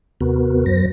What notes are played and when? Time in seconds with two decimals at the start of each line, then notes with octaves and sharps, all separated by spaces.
0.21 D#2 C3 B3 F#4 A#4 B4
0.66 F#2 F#3 C5 A#6